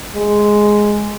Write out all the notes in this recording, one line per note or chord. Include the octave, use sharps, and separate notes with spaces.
G#3